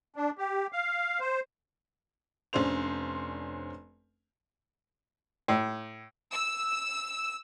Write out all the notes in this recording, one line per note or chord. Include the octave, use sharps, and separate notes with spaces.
D4
G4
F5
C5
F1 C#4 D4 C5 F7
A2
E6